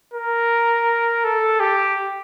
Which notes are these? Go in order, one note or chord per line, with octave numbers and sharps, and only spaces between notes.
A#4
A4
G4